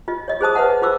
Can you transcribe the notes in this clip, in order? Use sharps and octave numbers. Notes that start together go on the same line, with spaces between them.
F4 D#5
C#5 D#5
G#4 C5 A5 D#6
B4 C5 D#5 E5 F#5 A5
F4 C5 D6 E6